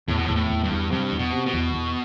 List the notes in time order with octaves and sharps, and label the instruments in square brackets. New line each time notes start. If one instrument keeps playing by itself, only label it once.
[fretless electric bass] E2 [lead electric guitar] A2
[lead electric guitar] B2
A2
[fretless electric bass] E2
[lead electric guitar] A2
[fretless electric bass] E2
[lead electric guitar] G2
[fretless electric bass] E2
[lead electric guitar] G2 [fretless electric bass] C3
[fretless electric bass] E2
[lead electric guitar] B2
[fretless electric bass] C3
[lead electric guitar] B2
[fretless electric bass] E2
E2